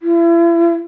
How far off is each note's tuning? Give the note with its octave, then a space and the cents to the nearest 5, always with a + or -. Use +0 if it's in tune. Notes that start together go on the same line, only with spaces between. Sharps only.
E4 +35